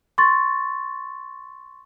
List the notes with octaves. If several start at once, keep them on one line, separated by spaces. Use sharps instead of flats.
C6 C#6 A6